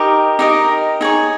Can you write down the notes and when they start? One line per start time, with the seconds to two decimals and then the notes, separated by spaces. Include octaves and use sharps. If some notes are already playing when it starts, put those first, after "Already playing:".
Already playing: D#4 G4 A#4 D#5
0.39 D#4 G4 A#4 D#5
1.01 D#4 G#4 C#5